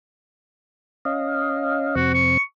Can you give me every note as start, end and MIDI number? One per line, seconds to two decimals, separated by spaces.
1.05 1.95 61
1.05 1.95 75
1.05 1.95 77
1.95 2.37 41
1.95 2.37 48
1.95 2.37 60
1.95 2.09 66
2.14 2.41 85